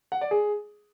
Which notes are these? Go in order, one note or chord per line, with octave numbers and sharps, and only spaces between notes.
F#5
D5
G#4